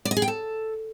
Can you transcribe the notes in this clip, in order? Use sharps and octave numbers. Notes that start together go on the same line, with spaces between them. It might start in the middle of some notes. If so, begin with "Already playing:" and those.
D5
D#5
G#4
G5
A4